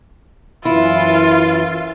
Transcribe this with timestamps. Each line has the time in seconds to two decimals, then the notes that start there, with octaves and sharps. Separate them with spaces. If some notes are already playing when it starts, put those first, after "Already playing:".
0.65 F#2 E3 E4 F4